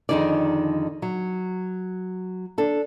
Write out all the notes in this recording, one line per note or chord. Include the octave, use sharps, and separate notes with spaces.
F2 D3 D#3 D#4 G#4 D5
F#3
D4 A4